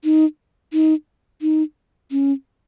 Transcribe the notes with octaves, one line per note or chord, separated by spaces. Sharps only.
D#4
D#4
D#4
C#4